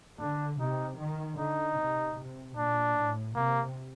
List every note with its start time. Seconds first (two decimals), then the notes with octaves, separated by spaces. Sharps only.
0.20 D3 D4
0.60 C3 D#4
0.99 D#3
1.38 D3 D#4
1.78 C3
2.17 C3
2.57 A#2 D4
2.96 A2
3.35 C3 A#3